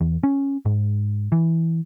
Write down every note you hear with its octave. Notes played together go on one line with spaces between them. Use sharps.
E2
C#4
G#2
E3